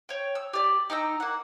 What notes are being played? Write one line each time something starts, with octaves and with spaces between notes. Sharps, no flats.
C#5 G5
E6
G4 D5
D#4 G5 A#5 E6
A#3 F#5